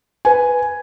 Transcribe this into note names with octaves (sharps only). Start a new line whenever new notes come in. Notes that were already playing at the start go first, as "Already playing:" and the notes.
B4 G#5